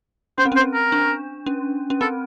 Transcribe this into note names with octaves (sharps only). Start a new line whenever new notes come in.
C#4 C5
C4
C#4 C5
A#4
D4
C#4
C#4
C4 A4